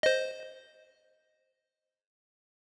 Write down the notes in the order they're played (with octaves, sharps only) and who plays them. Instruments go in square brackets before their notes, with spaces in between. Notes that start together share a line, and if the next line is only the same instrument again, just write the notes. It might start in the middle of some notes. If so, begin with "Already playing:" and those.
[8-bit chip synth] C5 D#5